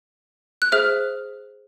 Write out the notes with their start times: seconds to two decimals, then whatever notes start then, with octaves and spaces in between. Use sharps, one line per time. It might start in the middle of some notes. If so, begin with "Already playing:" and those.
0.62 F#6
0.72 G#4 C5 E5 F6